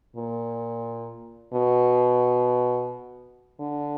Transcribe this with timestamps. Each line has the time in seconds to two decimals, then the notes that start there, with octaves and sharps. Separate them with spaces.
0.16 A#2
1.53 B2
3.59 D3